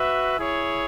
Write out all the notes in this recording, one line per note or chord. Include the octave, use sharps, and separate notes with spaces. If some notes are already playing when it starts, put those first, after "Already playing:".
Already playing: F#4 B4 E5
E4 G#4 C#5